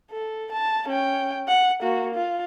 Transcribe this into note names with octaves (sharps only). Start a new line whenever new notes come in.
A4
A5
C#4 G5
F#5
A#3 F#4
F4